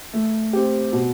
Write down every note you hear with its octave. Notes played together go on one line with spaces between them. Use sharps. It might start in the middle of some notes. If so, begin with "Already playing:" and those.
A3
C4 G4
B2